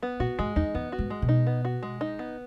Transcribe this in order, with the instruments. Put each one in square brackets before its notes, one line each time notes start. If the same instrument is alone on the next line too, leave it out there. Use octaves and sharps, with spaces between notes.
[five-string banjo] B3
[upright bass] A#2 [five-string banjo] F#4
[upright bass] G#2 [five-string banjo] G#3
[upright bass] E2 [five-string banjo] D#4
[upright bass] E2 [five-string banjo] B3
[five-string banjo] F#4
[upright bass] G#2
[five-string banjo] G#3
[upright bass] B2
[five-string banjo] D#4
B3
F#4
G#3
D#4
B3